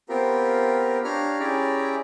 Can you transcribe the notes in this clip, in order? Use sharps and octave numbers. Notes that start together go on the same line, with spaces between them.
B3 C4 F4 G4 A#4
D4 G4 C#5 F5 A#5 F6
C#4 E4 G4 G#4 D5 A#5